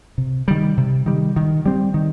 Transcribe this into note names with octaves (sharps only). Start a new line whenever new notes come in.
C3
D#3 G3
C3
D#3 G3
D#3
G3 C4
D#3